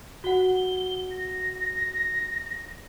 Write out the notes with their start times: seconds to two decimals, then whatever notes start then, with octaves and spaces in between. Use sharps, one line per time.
0.24 F#4 F#5 G7
1.10 A#6